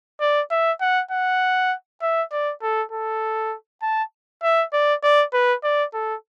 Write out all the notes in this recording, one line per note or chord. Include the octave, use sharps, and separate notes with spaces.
D5
E5
F#5
F#5
E5
D5
A4
A4
A5
E5
D5
D5
B4
D5
A4